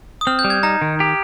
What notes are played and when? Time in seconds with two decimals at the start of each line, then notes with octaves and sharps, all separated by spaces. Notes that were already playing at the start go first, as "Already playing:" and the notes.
0.21 D#6
0.27 C4 F6
0.39 G6
0.44 G3
0.50 G#6
0.63 D#4 A#5
0.81 D#3
1.00 G4